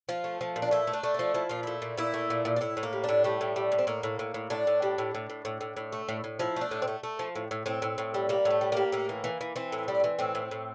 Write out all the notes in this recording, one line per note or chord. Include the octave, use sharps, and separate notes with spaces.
F3 F4
A3
F3
A#2
D4
A3 E4
A3
D4
A3
F3 D4
F3 E4
A#2 F4
A3 E4
A#2
A#2 E4
A3
A#2
A#2
D4
A2 E4
A2
A#3
G3
A2 D4
G3 A3
A2
G3
A2
C4
A2 A#3
A2
A2
A2
A2 D4
A2
G3
A2
A2
A2
A2
A2
A2
A3
A2
A2
F3 E4
A3 D4
A2
C4
A3
A3
F3
A2
A2
A2 C4
A2
A2
G3
G3 A#3
A2
A3
G3
G3 A#3
A2 A#3
E3
E3
E3
E3 C4
A2
G3
E3
A2 C4
A2
A2